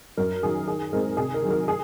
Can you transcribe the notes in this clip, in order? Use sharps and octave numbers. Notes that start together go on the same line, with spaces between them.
F#2 A#4
D#3 F#3 G#4
D#3 G#4
G#3 C4 D#4 A#4
C3 G#4
A#4
D#3 F#3
A#4
G#4